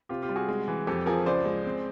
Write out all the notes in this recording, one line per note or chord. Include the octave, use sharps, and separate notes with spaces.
C3 F4 G4
F4 G4
G3
F#4 G#4
G#3
E3
F2 G4 A4
F3 G#4 A#4
C#2 C5 D5
G#3
C4